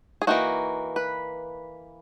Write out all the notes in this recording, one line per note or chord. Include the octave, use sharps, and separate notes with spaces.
G#4
E3 A#3 D#4 F#4
B4